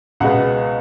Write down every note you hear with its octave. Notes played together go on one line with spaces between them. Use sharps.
C#2 B2 G#3 B3 F#5